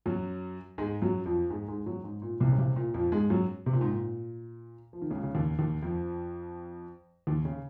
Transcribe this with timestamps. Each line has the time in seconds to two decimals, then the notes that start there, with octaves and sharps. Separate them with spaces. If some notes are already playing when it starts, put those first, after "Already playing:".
0.06 F#2 F#3
0.78 G#2 G#3
1.02 F#2 F#3
1.26 F2 F3
1.50 G#2 G#3
1.68 G#2 G#3
1.86 F#2 F#3
2.04 G#2
2.22 A#2
2.40 C2 C3
2.52 C#3
2.58 C2 C3
2.76 A#2
2.94 F2 F3
3.12 G#2 G#3
3.30 F#2 F#3
3.66 C3
3.73 A#2
3.81 G#2
3.88 A#2
4.93 F3
5.02 D#3
5.10 C#2 C#3
5.23 C#3
5.34 D#2 D#3
5.58 D#2 D#3
5.82 F2 F3
7.27 D#2 D#3
7.45 C#3